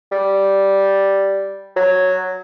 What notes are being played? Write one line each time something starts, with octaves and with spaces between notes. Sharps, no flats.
G3
F#3